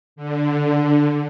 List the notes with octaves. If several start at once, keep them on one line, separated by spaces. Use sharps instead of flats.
D3